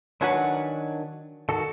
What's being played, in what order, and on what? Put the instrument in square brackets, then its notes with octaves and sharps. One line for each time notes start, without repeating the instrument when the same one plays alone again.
[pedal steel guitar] D#3 D4 G#5 [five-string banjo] F#3 F#4 B4
[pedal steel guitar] D#3 F#4 [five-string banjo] A4